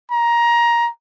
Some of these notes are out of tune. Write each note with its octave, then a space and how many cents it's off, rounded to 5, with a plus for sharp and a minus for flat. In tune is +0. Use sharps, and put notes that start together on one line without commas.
A#5 +15